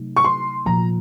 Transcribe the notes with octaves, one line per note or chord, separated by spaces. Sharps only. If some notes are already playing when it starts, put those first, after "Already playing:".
Already playing: C3 F#3 A3 D#4
C#6
C6
A#2 F3 A#3 A#5